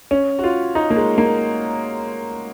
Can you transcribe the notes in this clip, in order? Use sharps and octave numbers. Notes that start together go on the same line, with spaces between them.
C#4
F#4
F4
D#4
A#3
G#3
A#3